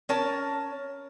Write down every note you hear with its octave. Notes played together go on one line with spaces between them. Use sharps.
C#4 A#4 A5